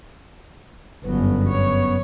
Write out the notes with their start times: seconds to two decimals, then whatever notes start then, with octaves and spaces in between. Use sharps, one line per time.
1.05 G1 F#2 F#3 B3
1.48 C#5